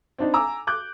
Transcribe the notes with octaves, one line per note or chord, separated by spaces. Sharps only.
C4 D4 D#4
G#5 A#5 D6 E6
D6 F#6 G6